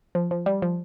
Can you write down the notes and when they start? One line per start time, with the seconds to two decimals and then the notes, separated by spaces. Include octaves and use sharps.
0.15 F3
0.31 F3
0.46 G3
0.62 F3